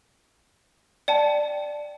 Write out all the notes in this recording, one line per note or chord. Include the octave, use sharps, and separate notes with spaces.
D5 G5 A5